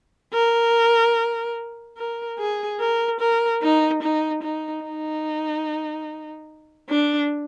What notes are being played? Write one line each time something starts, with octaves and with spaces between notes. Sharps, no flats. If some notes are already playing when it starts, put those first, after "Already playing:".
A#4
A#4
G#4
A#4
A#4
D#4
D#4
D#4
D#4
D4